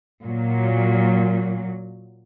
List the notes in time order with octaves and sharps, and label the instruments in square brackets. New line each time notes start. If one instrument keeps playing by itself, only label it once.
[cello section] A#2 F#3